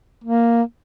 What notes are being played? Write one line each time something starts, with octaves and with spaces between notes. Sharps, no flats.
A#3